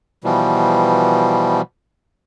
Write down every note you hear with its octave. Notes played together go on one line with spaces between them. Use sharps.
B2 E3 F3 G3